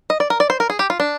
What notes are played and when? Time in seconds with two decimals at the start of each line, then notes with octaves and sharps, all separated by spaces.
0.10 D#5
0.20 D5
0.30 A#4
0.40 D5
0.50 C5
0.60 A#4
0.70 G#4
0.79 G4
0.90 F4
1.00 D4